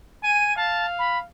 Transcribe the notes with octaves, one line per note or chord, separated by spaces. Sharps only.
G#5 D#7
F5 A5
B5